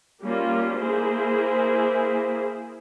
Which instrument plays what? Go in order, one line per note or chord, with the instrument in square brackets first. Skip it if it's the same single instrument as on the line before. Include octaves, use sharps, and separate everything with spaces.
[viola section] G3 A#3 C#4 F4
A#3 E4 G#4 C5